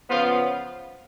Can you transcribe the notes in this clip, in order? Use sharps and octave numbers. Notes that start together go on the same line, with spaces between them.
C#3 F3 B3 F4